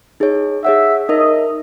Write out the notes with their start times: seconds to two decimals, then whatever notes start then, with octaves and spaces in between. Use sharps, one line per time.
0.20 D#4 G#4 C#5
0.65 G#4 C#5 E5 F#5
1.09 D#4 A#4 D#5 E5